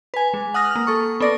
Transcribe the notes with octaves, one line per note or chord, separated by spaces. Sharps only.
B4 G#5
G#3
F#5 D#6 F6 A#6
A#3 F6
A4 C#6
B3 A4 D5 A#6